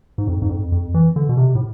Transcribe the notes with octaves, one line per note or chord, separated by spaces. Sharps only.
G#2
F2
G#2
F2
F2
E3
D3
B2
C3
A2